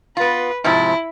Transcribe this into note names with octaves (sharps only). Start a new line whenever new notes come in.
B3 F4 B4
G#2 C3 F3 E4